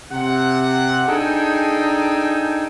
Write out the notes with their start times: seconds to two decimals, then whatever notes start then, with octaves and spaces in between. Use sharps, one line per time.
0.11 C3 F#5
1.08 D4 D#4 G#4 A4 G5 G#5